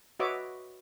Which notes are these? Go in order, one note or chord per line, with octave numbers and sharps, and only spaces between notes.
F#4 B4 C#5 D#5 E5 D6